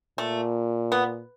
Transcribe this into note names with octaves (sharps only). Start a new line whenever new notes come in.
A#2 A3
B3